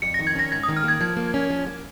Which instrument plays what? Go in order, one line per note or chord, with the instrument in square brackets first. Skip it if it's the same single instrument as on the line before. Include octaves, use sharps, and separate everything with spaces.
[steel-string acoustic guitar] F2 [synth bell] C#7
[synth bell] A#6
[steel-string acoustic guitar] D#3
[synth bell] G#6
[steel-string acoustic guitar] C#4 [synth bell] A#6
[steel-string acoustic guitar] G#2 [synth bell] G#6
[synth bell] D#6
[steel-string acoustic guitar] D#3
[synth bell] F6
[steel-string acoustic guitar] A#3 [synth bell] G#6
[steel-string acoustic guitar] F3 [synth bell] G#6
[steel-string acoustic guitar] A#3
C#4
F3
A#3